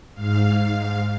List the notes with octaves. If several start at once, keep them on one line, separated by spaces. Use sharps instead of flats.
G#2 F5